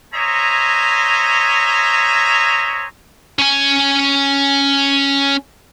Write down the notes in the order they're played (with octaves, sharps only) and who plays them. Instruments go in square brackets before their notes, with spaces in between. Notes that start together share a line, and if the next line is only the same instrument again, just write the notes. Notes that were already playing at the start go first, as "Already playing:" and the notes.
[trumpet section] C5 C#5 D#5 E5 G#5 A#5
[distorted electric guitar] C#4 G#5